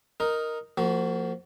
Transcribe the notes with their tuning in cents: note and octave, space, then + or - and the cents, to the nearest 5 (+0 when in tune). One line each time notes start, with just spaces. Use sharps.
D#4 +0 A#4 +0
F3 +0 A#3 -35 F#4 +15